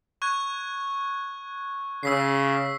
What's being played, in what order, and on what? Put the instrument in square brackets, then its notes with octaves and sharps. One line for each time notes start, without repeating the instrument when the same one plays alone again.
[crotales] C#6 F#6 G#6
[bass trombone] C#3 [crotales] E6 B6 C7